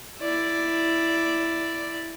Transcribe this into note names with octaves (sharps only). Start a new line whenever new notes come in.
E4 D5